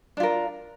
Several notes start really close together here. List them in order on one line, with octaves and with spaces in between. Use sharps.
D4 F4 A#4